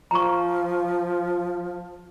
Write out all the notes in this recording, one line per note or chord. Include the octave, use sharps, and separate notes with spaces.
F3 A#5 C#6